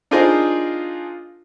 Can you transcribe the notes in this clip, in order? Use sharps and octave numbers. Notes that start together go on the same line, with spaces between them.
D4 D#4 F4 G#4 A#4 C5